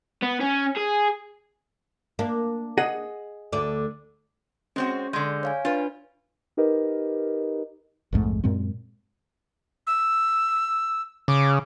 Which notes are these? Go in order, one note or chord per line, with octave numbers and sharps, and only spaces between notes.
B3
C#4
G#4
A#3 D4
G#4 D#5 F#5
D2 D3 D5
G#3 C4 C#4 F#4
D3 G#3 G6
C#5 F5 G#5
D4 F4 B4
D#4 G4 A#4 B4 D#5
A#1 F2 G#2 A3
F#2 A#2 G#3 C4
E6
C#3 D6